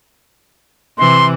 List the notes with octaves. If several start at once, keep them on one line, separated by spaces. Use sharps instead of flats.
C3 E3 C6